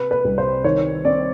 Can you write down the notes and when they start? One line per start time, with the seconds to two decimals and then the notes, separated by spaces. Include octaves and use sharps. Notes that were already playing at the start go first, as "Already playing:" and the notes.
Already playing: C3 B4
0.11 B4
0.25 C2
0.38 C5
0.64 D#3 C#5
1.05 C4 D5